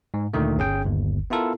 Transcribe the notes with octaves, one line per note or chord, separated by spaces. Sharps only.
G#2
D2 A#2 D3 D#3 A3
G1 C#4 G#4 G5
G1 D#2
B3 E4 F4 A4 A#4